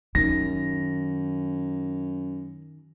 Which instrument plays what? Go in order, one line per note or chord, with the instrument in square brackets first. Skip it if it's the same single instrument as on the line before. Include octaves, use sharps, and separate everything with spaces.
[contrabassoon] F#2 [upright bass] D#3 [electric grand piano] A#6